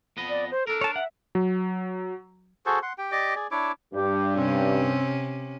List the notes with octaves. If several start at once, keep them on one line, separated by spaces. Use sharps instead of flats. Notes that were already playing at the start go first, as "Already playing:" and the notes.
F2 B3 D#5
D5
C5
D4 A4 A#4
C#5 A5
E5 F#5
F#3
F#4 G#4 A4 C5
F#5 C6
G4 G5
G4 D5 D#5 D6
G#4 D5
D4 E4 C#5 D6
G2 G4
C3 C4 C#4